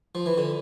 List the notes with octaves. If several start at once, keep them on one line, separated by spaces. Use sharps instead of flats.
F3
E3
D3